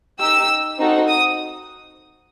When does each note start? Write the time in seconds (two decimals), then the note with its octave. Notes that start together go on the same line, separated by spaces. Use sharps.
0.20 D#4 G4 E6
0.79 C4 D#4 F#4 A4
1.08 D#6